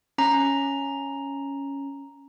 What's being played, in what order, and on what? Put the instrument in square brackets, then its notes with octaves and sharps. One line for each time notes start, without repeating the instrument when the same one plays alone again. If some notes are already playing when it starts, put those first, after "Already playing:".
[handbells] C#4 A#5